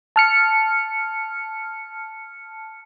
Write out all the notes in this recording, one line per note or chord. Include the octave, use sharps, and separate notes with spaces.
A5 F6 C#7